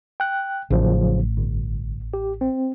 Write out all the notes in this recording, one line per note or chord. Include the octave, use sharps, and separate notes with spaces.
G5 F#6
A1 C#3 F3 F#3
G1
G4
C4